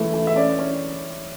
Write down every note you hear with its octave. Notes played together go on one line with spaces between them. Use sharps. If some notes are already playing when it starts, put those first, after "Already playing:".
Already playing: E3 A3
E3
E5
C#4 D5
C#4